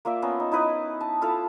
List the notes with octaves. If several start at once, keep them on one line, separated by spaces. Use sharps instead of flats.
A#3 F4 D5 E5
B3 C#4 A#5
D#4
D#4 E4 B4 D#5
A5
E4 F4 A4 F5